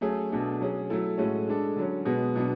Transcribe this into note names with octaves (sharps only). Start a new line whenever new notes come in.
F#3 A3 C#4 G#4
B2 A3 D4 G#4
F#3 C#4 G#4
F#3 A3 E4 A4
A2 G#3 C#4 F#4 A4
G#3 D4 A4
D3 F#3 C#4
B2 G#3 B3
B2 F#3 B3 D4